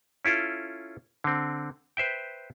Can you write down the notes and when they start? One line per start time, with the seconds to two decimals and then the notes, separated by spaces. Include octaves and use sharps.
0.25 C#4 E4 F4 A4
1.24 D3 C4
1.97 B4 C5 E5 G5